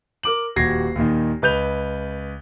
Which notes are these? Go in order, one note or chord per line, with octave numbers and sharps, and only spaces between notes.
A#4 D6 F#7
D#1 F#4 G4 G#6 A#6 C7
D#2 A#2 D#3
C#2 B4 G6 F7